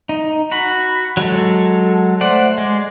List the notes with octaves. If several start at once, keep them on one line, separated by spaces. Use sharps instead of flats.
D#4
F#4 B5
F#3 G#3 A4
A3 C5 D5 F#5
G#3